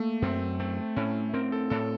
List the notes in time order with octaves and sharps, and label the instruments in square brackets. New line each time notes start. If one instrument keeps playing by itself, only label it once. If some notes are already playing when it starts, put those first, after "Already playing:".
Already playing: [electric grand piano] A3 [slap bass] A#3
[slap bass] F#2 [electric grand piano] C4
[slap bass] A3 [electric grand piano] C4
[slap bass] A2 [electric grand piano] C#4
[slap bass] C4 [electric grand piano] A#4
[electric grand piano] A4
[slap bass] A2 [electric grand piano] A4